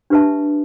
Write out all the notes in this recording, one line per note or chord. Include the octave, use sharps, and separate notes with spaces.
D4 G4 B4 E5 A5